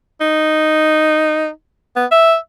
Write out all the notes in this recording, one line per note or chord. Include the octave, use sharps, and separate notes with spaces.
D#4
B3
E5